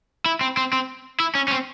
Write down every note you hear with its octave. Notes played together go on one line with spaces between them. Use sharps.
E4
C4
C4
C4
E4
C#4
C#4
C4